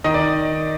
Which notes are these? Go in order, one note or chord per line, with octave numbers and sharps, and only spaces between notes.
D#3 D#5
D5